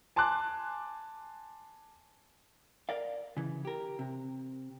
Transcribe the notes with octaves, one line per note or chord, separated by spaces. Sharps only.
G#5 A5 C6 D6 F#6
A#4 D5 F5
C#3 E3
G4 A#4
C3